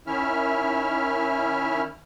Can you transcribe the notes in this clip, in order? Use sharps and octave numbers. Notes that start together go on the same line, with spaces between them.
D#3 C#4 E4 E5 F6